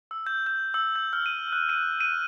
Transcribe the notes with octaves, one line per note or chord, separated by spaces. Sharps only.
E6
G6
G6
E6
G6
F6
D#7
F#6
D#7
D#7